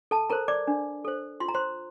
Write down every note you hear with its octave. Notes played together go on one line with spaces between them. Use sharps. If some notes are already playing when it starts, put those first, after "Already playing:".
A4 A5
A4 A#4 C5 A#5
D5 D6
D4
A4 C5
F4 C6
A#5
C5 C6